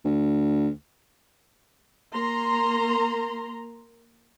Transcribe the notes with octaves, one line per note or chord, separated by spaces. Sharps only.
D2
A#3 A#5 C6